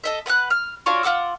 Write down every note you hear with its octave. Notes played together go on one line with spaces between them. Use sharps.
A4 D#5 E5
B4 F#5 D#6 F#6
F6
D4 F4 F#4 C#5
F4 F#5 D6 E6